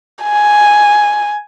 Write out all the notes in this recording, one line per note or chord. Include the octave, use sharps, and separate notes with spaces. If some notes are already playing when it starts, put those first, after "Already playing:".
G#5